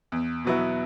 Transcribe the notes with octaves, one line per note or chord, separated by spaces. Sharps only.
E2
B2 F#3 B3 E4